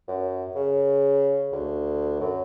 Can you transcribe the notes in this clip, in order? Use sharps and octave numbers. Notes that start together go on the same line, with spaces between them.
F#2
C#3
D2
F#2